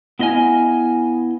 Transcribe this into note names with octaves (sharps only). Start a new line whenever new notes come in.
B3 E4 D#5 F5 G#5